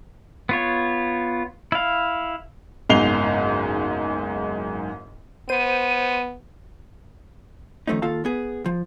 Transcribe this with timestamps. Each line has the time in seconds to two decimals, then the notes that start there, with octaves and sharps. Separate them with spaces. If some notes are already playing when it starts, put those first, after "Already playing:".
0.49 B3 F4 C#5
1.72 E4 F5
2.89 F#1 B1 G#2 C7 F7 G7
5.49 B3 C5 D#7
7.87 D#3 F3 A3 C#4 D#4
8.02 D#3 A#3 F4 A4 F5 A5
8.25 B3 G#4
8.66 F3